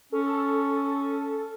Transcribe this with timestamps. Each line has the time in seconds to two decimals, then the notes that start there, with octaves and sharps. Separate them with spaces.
0.12 C#4 A4